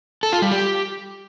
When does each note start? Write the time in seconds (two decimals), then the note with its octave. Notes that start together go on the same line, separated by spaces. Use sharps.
0.23 A4
0.33 F4
0.42 G3
0.52 G4